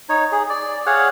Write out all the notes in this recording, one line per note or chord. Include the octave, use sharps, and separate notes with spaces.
D#4 C#5
G#4
D5
G#4 C#5 F5 F#5